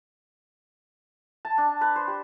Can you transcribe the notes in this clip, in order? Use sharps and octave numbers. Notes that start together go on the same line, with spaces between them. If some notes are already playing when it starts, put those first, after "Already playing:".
A5
D4
B4
C5
G4